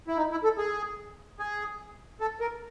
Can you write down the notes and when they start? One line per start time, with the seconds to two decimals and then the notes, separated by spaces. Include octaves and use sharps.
0.08 E4
0.17 D#4
0.31 E4
0.44 A4
0.58 G#4
1.39 G#4
2.21 A4
2.40 A#4